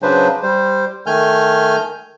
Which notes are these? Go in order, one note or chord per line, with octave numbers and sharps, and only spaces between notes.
C#3 F#3 D4 B4 C5
G3 C5
D#3 A3 G#5 F6 G6